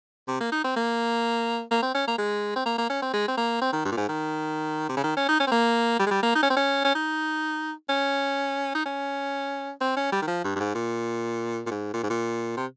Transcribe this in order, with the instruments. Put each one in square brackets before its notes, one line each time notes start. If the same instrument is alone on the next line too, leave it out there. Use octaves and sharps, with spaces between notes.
[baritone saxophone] C3
A#3
D#4
C4
A#3
A#3
C4
C#4
A#3
G#3
C4
A#3
A#3
C#4
C4
G#3
C4
A#3
C4
D#3
G2
A#2
G#2
D#3
C3
C#3
D#3
C#4
D#4
C#4
C4
A#3
G3
G#3
G3
A#3
D#4
C#4
C4
C#4
C#4
D#4
C#4
D#4
C#4
C4
C#4
G3
D#3
F3
G2
G2
G#2
A#2
A#2
G#2
A#2
G#2
A#2
C3